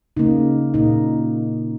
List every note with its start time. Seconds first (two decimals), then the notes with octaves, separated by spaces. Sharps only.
0.17 C#3 A#3 D#4
0.74 A#2 A#3 D#4